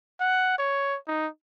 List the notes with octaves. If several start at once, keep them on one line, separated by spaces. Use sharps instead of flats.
F#5
C#5
D#4